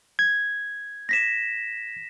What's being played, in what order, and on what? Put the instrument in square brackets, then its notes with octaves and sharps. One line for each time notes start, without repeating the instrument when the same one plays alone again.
[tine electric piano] G#6
[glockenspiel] A#6 B6 E7